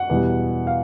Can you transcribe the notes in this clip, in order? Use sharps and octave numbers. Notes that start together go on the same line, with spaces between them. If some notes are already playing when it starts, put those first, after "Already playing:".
Already playing: F#5
E2 B2 G3
F5